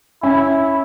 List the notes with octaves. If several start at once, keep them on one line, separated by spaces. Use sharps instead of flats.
C#4 E4